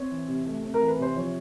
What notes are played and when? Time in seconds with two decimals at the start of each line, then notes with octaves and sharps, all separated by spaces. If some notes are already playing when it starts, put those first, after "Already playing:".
Already playing: C4 C#5
0.11 E3
0.28 C3
0.46 A3
0.63 C4
0.74 A#4
0.81 E3
0.88 B4
0.98 C3 C5
1.16 F3 C#5